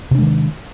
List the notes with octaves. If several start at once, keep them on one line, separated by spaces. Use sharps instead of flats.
C3 D#3 G#3 D4